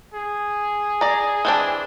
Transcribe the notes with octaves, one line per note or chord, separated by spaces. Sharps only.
G#4
D5 A#5
E3 C4 D4